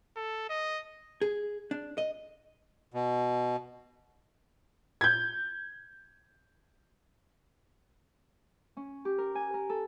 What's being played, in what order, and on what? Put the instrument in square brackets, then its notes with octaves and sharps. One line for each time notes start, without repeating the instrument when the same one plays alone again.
[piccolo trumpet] A4
D#5
[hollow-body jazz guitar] G#4
D4
D#5
[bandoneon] B2
[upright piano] G6 G#6
[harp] C#4
G4
A#4
G#5
A#4
A4